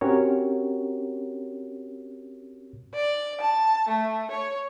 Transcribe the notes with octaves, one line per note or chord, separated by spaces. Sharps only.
C4 C#4 F#4 G4 A#4 C#5
D5
A5
A3
C#5